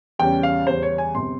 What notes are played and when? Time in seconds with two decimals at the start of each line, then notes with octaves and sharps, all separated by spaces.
0.19 E2 C#3 G3 C#4 G5
0.43 F5
0.67 E2 C#3 G3 C#4 C5
0.82 C#5
0.98 G#5
1.14 G1 C3 C6